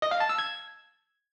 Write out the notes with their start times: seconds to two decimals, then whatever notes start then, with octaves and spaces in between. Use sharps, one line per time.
0.02 D#5
0.11 F5
0.20 A5
0.29 E6
0.38 G#6